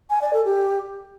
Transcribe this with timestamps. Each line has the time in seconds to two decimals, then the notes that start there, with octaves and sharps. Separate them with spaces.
0.10 G#5
0.21 D5
0.33 A4
0.45 G4